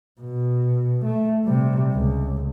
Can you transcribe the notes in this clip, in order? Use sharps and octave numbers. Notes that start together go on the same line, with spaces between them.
B2
A3
C3 G3
C#2